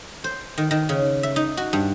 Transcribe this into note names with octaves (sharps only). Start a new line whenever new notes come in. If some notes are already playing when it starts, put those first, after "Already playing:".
C5
D#3
D#3
C#3
E5
D#4
F#4
G2